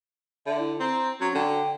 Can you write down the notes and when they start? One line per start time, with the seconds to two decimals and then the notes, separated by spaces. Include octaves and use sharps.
0.46 D3 E5
0.59 E4
0.80 C4 A#5
1.21 F#3 C#4
1.35 D3 G5